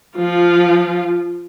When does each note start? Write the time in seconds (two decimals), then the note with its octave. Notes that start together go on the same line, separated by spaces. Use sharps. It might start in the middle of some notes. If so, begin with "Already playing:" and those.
0.17 F3 F4